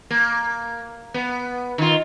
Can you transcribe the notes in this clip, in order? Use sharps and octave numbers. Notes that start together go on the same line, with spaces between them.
A#3
B3
D#3 F4